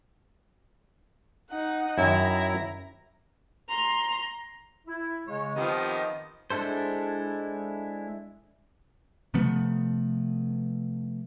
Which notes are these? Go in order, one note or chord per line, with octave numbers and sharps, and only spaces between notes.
D#4 F#5
F#2 D#3 E4 A#5
A#5 C6
E4
C#3 G#3 C#5
D#3 F3 B3 C4 G4 D#5
G#3 D4 E4 A4 C5
C3 F3 A3 B3